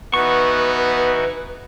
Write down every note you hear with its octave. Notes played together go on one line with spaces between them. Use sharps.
E3 B3 D#4 F#4 B4 C#6